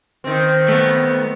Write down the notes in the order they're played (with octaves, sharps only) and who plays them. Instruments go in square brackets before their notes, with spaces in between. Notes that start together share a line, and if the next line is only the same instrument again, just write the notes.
[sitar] D#3 C4
[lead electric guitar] A3 B3